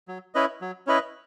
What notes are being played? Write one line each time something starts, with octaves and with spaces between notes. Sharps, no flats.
F#3
C#4 E4 B4 D#5
F#3
C#4 E4 B4 D#5